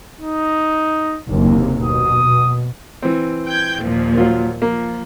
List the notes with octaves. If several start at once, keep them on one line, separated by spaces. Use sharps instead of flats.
D#4
F#1 D#2 C3
B2 D#6
E3 C4
G5 G6 G#6
D#2 A#2 F3
F#3 F4
F3 A#3